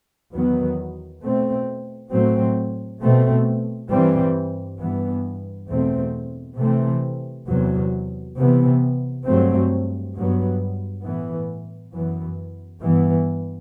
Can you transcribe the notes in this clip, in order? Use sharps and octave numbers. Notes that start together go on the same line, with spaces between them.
E2 D#3 F#3 B3
B2 A3 C4
A2 F#3 A3 C4
B2 A3 C4
G2 E3 G3 C4
G2 E3 B3
E2 B2 A3 C4
C3 E3 A3 C4
E2 C3 F#3
C3 E3 B3
G2 F#3 A3 C4
G2 F#3 B3
A2 E3 B3
F#2 E3 B3
G2 E3 B3